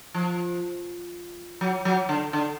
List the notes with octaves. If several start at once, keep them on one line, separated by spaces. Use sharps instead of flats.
F3
F#3
F#3
D3
D3